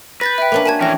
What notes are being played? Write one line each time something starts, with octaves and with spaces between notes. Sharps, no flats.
B4 G6 A6 A#6
E5 G5
A#3 C#4 D4
F#4 A#4 G#5 A5 G#6
E3 C#4 G5 A#6